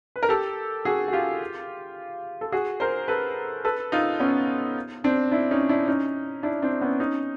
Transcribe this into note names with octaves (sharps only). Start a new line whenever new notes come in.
B4
A#4
G4 A4
F#4 G#4
F#4
F4 G4
A4
F#4 G#4
A#4 C5
A4 B4
A4 B4
D#4 F4
B3 C#4
C4 D4
D4 E4
C#4 D#4
D4 E4
C#4 D#4
D4 E4
C4 D4
B3 C#4
C#4 D#4